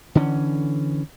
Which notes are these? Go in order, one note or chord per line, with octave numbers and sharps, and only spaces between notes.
D3 E3 C#4